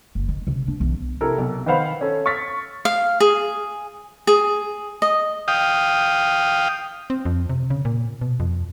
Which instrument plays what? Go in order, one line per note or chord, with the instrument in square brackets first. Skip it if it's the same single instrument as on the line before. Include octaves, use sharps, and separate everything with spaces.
[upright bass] F#1
D#3
C3 C#4
D4
B1 E3
[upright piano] C3 E4 A4 A#4
B1
D#3 B4 C5 F5 F#5 B5
C#4 A4
C#6 F6 A6 B6
[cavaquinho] F5
G#4
G#4
D#5
[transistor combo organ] F5 G5 D#6
[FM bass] C4
F2
C3
C#3
A#2
B2
F2